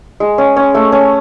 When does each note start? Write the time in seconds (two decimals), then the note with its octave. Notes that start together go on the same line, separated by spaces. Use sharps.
0.20 G#3
0.38 C#4
0.56 C#4
0.75 A3
0.92 C#4